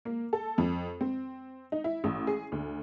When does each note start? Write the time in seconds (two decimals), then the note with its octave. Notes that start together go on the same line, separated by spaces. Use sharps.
0.05 A#3
0.33 A4
0.58 F2
1.01 C4
1.72 D#4
1.84 E4
2.04 A1
2.27 G#4
2.52 D2